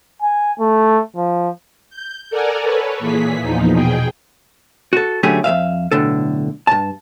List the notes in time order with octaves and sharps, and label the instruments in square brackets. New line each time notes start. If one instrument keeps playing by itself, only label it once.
[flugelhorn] G#5
A3
F3
[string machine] G6
A4 A#4 D5 F#5 G#5 A#5
A4 B4 C#5
A#2 E3 G#4 B6
E2 A#2 F3 D#4
B2 G#4 G5
[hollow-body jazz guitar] F#4 A4
D3 F#3 A3 C#4 G4 G#4
F2 B2 E5 F5
B1 A2 D3 A4
G2 A5